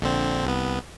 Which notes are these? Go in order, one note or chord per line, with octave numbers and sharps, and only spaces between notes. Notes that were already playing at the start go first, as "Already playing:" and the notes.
A#1 D3 C4
C2 B3